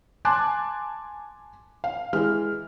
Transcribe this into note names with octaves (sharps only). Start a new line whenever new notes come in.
G#5 A5 C6 D6 F#6
F5
E3 G#3 F6